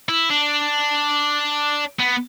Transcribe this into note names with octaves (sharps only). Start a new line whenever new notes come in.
E4
D4
B3